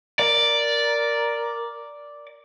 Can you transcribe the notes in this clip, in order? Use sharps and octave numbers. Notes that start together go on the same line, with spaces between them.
A#4 D5